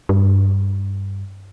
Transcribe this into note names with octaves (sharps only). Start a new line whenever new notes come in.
G2